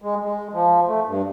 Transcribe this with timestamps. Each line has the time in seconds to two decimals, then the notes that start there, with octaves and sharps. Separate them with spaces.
0.02 G#3
0.23 G#3
0.53 F3
0.87 A3
1.07 G2